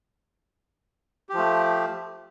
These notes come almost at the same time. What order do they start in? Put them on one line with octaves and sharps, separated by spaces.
G4 F3 A3